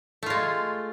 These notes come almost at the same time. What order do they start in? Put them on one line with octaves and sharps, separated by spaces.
A3 F4 G#3